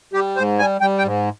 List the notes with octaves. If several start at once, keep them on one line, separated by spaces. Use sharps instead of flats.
G3 G4
G#2 C5
G3 G#5
G3 G5
G5
G#2